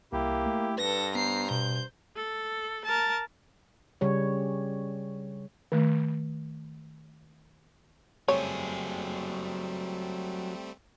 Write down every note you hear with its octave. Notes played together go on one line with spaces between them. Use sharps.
C2 A#3 E4 G4
A3
G2 A4 B4 A#6
B3 C5 A#5 C7
B2 G6
A4
A#4 A5
C#3 G3 C#5
D#3 A3
F#3 G3 A3 C4 G#4 C#5